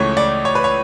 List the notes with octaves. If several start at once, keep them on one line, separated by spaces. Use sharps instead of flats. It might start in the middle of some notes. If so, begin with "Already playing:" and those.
Already playing: C#2 C#3 E3 A3 C#5
D5
C#5
B4
C#5